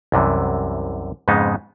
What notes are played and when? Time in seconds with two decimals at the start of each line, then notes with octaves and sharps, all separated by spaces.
0.12 C2 F#2 C3 E3
1.28 F2 G#2 C#3 G#3 B3 D#4